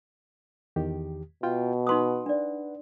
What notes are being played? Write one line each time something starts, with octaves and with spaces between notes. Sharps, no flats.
E2 D#3 G4
B2 F4 G5
D#4 B4 F#5 C6 D#6
D4 D5